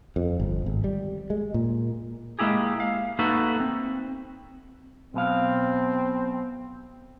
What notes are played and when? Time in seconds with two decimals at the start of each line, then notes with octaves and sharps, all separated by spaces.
0.16 F2
0.40 G1
0.66 G#1
0.84 G3
1.30 G#3
1.54 A#2
2.39 G#3 A#3 E4 G4 G#4
2.80 F5
3.19 A3 A#3 D#4 F#4 A4 B4
3.60 C4
5.14 B1 B2 C4 F5